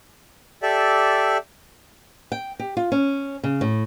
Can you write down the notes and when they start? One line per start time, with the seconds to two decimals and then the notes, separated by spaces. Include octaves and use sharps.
0.62 G4 A4 D5 E5
2.32 G5
2.59 G4
2.77 F4
2.92 C#4
3.44 C#3
3.61 A2